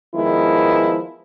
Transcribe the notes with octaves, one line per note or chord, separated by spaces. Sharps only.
D#3 F3 G#3 B3 E4